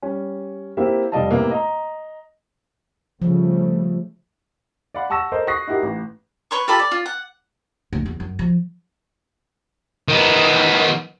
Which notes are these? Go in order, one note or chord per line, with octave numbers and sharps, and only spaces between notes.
G3 C#4
A#3 C4 E4 G4 E5
F1 G3 D5 D#5 F5 A5
A2 C3 A#3 B3
D#5 A#5
C#3 F3 G3 A3
D5 F5 F#5 B5
F#5 A5 C#6 E6 A#6 E7
A4 A#4 C5 D#5
C#6 D#6 F#6 A#6 C7
D#4 E4 F#4 G4 A#4
A1
B4 C#5 C6 C#6
F4 G4 A4 B5
D5
F4
F#5
D2
E2
F#2
F3
D#3 B3